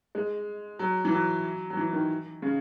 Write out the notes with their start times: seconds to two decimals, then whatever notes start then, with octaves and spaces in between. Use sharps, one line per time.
0.15 G#3
0.79 F#3
1.05 E3
1.12 F#3
1.70 F#3
1.77 E3
1.93 D#3
2.42 C#3